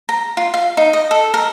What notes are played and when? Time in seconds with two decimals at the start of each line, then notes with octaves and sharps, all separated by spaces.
0.09 A#5
0.37 F4
0.54 F5
0.77 D#4
0.93 D#5
1.11 A4
1.34 A#4